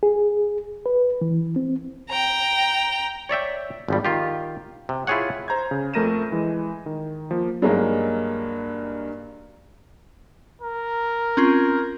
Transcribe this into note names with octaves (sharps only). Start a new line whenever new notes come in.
G#4
B4
E3
C4
G5 A#5
C#5 D5 E5 G5
G#1 F3 G3
D#3 F4 G4
C3
E4 F4 G4 G#4 C#5 F#5
C5 A#5 G6 G#6
C#3
F2 A3 A#4 A#6 D#7 E7
E3 G#3
D#3
F3 A#3
G2 F#3 G#3 A#3 D#4
A#4
C4 C#4 F4